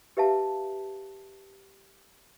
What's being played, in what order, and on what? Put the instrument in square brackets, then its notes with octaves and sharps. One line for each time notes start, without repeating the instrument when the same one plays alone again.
[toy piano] G4 B4 E5 F5 A5